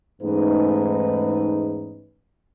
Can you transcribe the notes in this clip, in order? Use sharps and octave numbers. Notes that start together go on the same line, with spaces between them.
E2 G#2 A3 C#4 D#4 B4